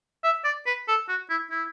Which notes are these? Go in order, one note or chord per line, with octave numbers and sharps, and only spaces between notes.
E5
D5
B4
A4
F#4
E4
E4